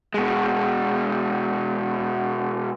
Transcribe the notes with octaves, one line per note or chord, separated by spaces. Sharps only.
B2 G#3